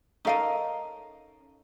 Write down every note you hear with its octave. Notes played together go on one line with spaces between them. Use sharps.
C#4 D#4 A4 A#4 D#5 F5